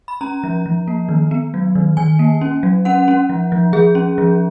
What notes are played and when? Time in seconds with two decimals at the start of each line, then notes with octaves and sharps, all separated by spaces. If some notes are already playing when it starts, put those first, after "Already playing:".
0.08 B5
0.21 C#4 A#5
0.44 F3
0.66 F3
0.88 A#3
1.09 D#3
1.31 B3
1.54 F#3
1.75 D#3
1.97 D#3 G#5
2.19 A#3
2.41 C#4
2.63 F#3
2.85 C#4 F#5
3.08 C#4
3.29 F3
3.52 F3
3.73 F3 G#4
3.95 C#4
4.18 F3